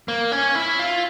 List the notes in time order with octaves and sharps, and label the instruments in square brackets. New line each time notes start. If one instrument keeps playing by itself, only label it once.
[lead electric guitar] A#3
C#4
E4
F4